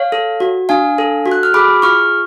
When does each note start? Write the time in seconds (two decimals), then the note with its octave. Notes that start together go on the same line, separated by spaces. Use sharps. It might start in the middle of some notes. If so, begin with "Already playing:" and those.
Already playing: C#5 F5
0.12 A4
0.40 F#4
0.69 D4 F5 G#5
0.98 A4
1.26 F#4
1.31 F#6
1.43 F6
1.54 G#4 B5 D6
1.82 F4 C#6 F6